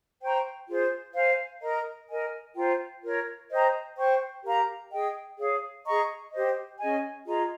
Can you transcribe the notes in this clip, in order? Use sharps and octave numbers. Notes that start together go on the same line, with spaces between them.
C5 G5 A#5 C#6
F4 G#4 C5
C5 F5 G#5
A#4 D#5 A#5
A#4 D#5 G#5
F4 C5 G5 A#5
F4 A#4 C#5
C5 D#5 G5 A#5
C5 G5 C#6
G4 A#4 F5 A#5
G#4 D#5 G5
G#4 C#5 F5
G#4 D#5 A#5 C#6
G4 C5 D#5
C#4 G#4 D#5 G#5
F4 G#4 D#5 A#5